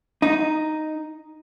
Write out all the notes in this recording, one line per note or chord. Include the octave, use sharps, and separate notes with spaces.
D#4